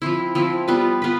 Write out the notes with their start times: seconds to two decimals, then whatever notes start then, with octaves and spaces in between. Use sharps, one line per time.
0.02 F3 C4 E4
0.35 F3 C4 E4
0.68 G3 B3 F4 B4
1.02 B3 F4 B4